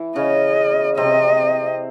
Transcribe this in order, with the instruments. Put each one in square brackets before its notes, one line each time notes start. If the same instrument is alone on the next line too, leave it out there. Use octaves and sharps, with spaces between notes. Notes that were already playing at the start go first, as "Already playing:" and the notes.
Already playing: [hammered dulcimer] E3 E4
[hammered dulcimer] C#3 C#4 [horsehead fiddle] D#5
[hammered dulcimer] C3 C4 [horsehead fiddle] D#5